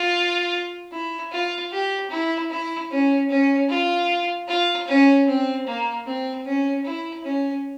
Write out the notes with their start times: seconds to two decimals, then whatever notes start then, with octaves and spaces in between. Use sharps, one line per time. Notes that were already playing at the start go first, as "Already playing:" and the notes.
Already playing: F4
0.92 E4
1.32 F4
1.71 G4
2.10 E4
2.50 E4
2.90 C#4
3.29 C#4
3.69 F4
4.48 F4
4.87 C#4
5.27 C4
5.66 A#3
6.06 C4
6.45 C#4
6.85 E4
7.24 C#4